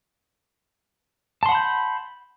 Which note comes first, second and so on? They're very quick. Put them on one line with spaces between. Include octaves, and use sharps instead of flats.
A5 C6 F#5 B5 G6